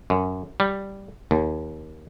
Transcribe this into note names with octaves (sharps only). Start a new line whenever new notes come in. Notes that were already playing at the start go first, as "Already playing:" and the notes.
F#2
G3
D#2